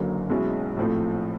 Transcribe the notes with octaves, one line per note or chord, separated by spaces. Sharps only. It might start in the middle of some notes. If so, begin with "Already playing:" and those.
Already playing: F#1 F#2 D3 F#3 A#3
B1 B2 G#3 C#4 E4
A#1 A2 F3 A3 C4